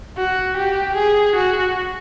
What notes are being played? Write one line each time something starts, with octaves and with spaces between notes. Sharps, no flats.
F#4
G4
G#4
F#4